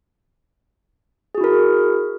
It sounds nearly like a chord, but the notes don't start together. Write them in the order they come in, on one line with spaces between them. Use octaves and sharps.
G#4 F#4 E4 A#4